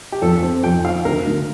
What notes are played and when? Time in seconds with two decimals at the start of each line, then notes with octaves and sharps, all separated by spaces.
0.12 G4
0.22 F2 A4
0.42 C4
0.63 F2 G5
0.85 F3 F5
1.05 D2 A#4
1.27 D2